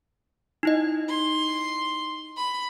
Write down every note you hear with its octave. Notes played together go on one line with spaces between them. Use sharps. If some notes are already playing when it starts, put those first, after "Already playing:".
D#4 E4 D#5
C6
B5